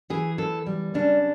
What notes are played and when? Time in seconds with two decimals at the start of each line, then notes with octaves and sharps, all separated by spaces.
0.10 E3 G#4
0.38 E2 A4
0.66 G3
0.94 C#3 D4